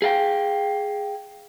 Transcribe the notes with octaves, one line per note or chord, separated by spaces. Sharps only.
G#4 F5 G5